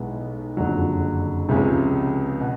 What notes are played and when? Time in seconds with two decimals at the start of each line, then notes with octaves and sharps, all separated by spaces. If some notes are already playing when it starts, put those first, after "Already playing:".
Already playing: B1 B2 G#3 B3 E4
0.57 F#1 F2 D3 F#3
1.49 C#2 C3 F3 G#3 C#4
2.41 B2